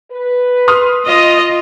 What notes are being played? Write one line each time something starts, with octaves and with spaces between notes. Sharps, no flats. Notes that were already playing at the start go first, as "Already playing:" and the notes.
B4
C6 D#6 F6
F4 D#5